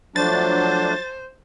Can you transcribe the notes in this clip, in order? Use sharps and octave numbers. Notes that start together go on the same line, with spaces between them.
F3 F#3 A3 D4 C5 A6